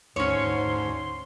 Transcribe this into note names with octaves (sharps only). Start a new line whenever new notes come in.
D2 G#2 C#4 C#5 C6